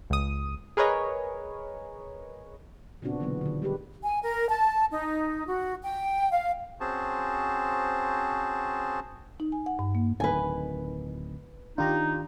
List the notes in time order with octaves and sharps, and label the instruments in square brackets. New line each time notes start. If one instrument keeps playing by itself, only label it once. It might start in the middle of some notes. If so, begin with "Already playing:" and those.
[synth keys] C#2 D#6
G#4 A#4 B4 C#5 D#5
[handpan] A#2 C#3 B3 C4 D4 F#4
B2 D3 E3 F#3 B3
D3 D#3
G3 G#3 G4 B4
[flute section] G#5
A#4
A5
D#4
F#4
G5
F5
[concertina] C4 C#4 F#4 G#4 C5 A5
[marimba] D#4
G#5
F#5
G2
A#3
[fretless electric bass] D1 D#3 [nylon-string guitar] B4 G#5
[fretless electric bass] D#3 D4 [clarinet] D#4 [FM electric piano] F4 G4 A#5